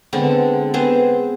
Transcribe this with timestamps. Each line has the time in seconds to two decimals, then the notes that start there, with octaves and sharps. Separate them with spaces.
0.13 D3 G#3 B3 C4
0.74 B3 C4 G#4 C5